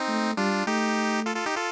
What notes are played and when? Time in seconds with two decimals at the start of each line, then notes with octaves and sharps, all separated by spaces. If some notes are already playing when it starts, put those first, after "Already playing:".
Already playing: C4 D#4
0.08 A3
0.37 G3 D4 F4
0.67 A3 D#4 G4
1.26 F4 A4
1.36 F4 A4
1.46 D#4 G4
1.56 F4 A4